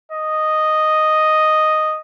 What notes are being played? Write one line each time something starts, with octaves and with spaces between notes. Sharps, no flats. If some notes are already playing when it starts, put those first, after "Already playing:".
D#5